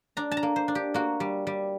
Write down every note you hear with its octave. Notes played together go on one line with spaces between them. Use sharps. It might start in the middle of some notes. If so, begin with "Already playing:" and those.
D4 A#5
A5
A#5
A#3
C5
D4
G4
A#3 F#4
G3
G3